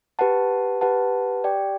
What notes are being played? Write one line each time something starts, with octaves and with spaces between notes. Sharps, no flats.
G4 B4 F#5 A5
G4 B4 F#5 A5
G4 D5 G5